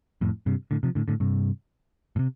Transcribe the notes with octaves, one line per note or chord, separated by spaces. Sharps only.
F2 A2
G2 C3
A2 D3
C3 F3
A2 D3
A2 D3
G2 C3
A2
C3